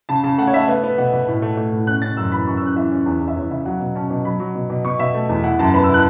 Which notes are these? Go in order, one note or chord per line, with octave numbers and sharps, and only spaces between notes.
C#3 A5
C#3 A5
A3 F#5
C#5
A3 E5
B3 E5
B3
B2 F#5
B2
A2
A3
A3
A2
C#4 F#6
C#4 A6
F#2 E6
E3 B5
F#2 C#6
C#4 E6
F#6
E3 E5
C#4
E2
E2
E5
E2 C#5
C#3 E5
F#3 F#5
B2
C#4 A5
B2
F#3 B5
F#3
B2
B2
B2 C#6
B2 E5
A3
E2
E4 F#5
F#2 A5
B3 B5
E6
E4 F#6